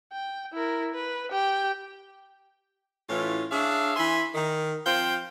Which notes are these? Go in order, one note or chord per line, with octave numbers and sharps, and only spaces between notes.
G5
E4 A#4
B4
G4 G5
A2 E3 C#4 F4
D4 G#4 C#5 E5 F5
E3 E5 G#5 B5 C6
D#3
F3 C4 F5 G5